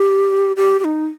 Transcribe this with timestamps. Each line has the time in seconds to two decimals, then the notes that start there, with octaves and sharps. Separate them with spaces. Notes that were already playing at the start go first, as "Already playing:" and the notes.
Already playing: G4
0.57 G4
0.80 G4
0.84 D#4